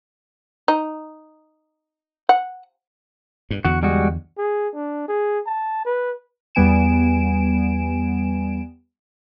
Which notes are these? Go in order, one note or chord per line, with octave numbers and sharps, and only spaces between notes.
D#4
F#5
G2
E2 D3 F#4
G3 G#3 F#4
G#4
D4
G#4
A5
B4
E2 G3 B3 G#5 D7 E7